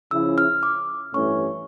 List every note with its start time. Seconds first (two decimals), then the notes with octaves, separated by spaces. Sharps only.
0.11 C#3 F3 C#4 E4 E6
0.38 F6
0.63 D6
1.13 A1 G2 E3 A3 C#4 C#6